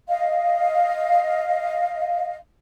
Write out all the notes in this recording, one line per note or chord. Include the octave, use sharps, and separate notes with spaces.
D#5 F5